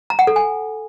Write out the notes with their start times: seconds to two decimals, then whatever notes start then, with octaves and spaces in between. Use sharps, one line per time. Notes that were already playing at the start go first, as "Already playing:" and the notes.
0.10 A#5
0.19 F#5
0.27 A4
0.36 G#5